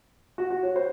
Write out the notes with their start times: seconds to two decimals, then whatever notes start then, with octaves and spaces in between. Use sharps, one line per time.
0.38 F#4
0.50 F#4
0.63 C#5
0.76 C5